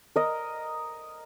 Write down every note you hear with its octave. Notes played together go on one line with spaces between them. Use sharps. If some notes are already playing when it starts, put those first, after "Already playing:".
A#4 D#5